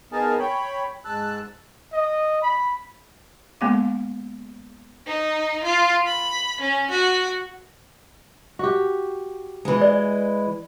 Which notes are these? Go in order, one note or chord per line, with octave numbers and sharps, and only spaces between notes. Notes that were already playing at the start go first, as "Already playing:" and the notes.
B3 D#4 G#4 A#4 G#5 A5
C#5 G5 B5
G#2 A5 E6 F#6
D#5
B5
G#3 A#3 B3 C#4 F5 D6
D#4
F4
B5
C#4
F#4
F#4 G4
E3 G#3
D5